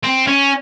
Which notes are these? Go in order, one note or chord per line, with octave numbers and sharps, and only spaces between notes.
C4
C#4